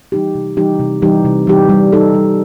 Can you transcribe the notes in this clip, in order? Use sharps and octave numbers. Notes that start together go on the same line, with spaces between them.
E3 G3 D#4 G4
C3
E3 G3 D#4 G4
C3
E3 G3 D#4 G4
C3
E3 G3 D#4 G4
G3
D#4 A4
G3